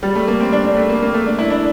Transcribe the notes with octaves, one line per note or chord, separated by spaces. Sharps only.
G3
A3
A#3
C4
D4
D4
A3
A#3
A#3
A3
D4
E4
D4